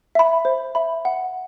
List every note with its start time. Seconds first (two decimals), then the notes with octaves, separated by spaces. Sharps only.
0.15 E5 B5
0.45 C5
0.75 E5 B5
1.05 F#5